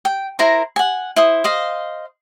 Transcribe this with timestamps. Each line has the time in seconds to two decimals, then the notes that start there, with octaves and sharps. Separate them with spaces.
0.05 G5
0.39 E4 A#4 C5 A#5
0.76 F#5 G#5
1.16 E4 C5 D#6
1.44 C5 D#5 F5